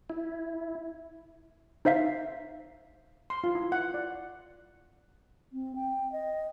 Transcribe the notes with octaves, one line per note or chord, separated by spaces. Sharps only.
E4
D#4 C5 E5 F5 B6
C6
F4
E4
F#5
D5
C4
G5
D#5